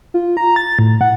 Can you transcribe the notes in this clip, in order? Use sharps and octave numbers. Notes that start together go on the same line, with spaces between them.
F4
A#5
A6
A2
F#5